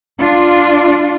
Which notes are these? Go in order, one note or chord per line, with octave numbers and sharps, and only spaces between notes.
D4 F4